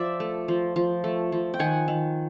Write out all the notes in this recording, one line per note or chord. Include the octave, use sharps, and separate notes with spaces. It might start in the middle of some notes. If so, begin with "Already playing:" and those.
Already playing: F3 D5 E5
A3
F3
F3
A3
F3
G5
D#3 F#5 G#5
D#3